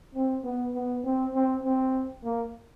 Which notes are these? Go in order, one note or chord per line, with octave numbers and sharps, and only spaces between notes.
C4
B3
B3
C4
C4
C4
A#3